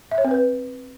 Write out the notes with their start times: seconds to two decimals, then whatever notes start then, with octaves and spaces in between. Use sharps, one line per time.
0.11 E5
0.18 C#5
0.25 C4
0.31 B4